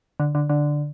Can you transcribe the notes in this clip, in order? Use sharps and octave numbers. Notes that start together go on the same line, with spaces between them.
D3
D3
D3